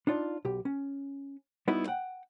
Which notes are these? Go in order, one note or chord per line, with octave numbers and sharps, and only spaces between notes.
D4 D#4 F4 D5
B1 G4
C#4
G3 B3 D#4 E4 F#4 E5
F#5 G5